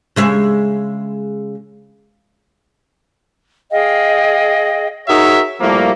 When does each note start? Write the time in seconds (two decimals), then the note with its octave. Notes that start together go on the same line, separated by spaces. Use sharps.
0.16 C#3 G#3 E5
3.71 G#4 D#5 F5 G5
5.08 D#4 F#4 G#4 A#4 C#5 E5
5.61 A2 F3 G3 A3 A#3